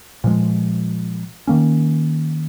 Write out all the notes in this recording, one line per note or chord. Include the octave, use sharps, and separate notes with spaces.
A#2 F3 G#3
D#3 A#3 C#4